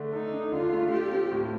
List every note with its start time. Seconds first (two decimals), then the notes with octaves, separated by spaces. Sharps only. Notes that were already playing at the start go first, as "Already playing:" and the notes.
Already playing: D3 A3 D4
0.13 D#4 A4
0.33 D4
0.52 D3 F4
0.73 A3
0.92 F4 G4
1.12 C4
1.32 A2